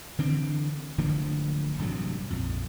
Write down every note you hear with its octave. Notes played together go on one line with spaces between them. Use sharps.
D3 E3 C4
D1 D3 F3 A#3
A1 G2 C3 F#3
A#1 F2